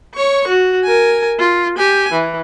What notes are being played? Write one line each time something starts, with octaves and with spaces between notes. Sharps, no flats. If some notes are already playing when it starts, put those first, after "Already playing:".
C#5 C#6
F#4
A#4 G#5
F4
G4 G#5
E3